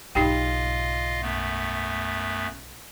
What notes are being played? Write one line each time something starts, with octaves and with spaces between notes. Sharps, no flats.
B1 G#2 D#4 F4 G4 D#5 F5 G5
F#2 A3 B3